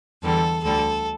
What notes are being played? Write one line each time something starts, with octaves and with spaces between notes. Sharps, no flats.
E2 D3 G3 A4
D2 D3 G3 A4